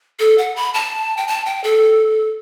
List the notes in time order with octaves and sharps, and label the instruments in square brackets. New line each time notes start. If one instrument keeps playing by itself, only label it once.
[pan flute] A4
F#5
B5
A5
G5
A5
G5
A4